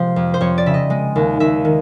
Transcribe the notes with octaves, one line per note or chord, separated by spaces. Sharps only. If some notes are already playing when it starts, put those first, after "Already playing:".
Already playing: C3 F3 G#3 C5
F2
C5
F2 C#5
D5
C#3 E5
D#5
G#3
D#2
D#2 E5
D#3